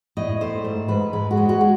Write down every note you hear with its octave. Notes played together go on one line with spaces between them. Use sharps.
A2 D#5
A3 C5
G#2
G#2 B4
G#3 B4
F#4
G#3
F#4
G#3